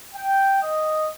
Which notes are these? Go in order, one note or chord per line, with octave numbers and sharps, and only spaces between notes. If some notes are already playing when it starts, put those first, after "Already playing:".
G5
D#5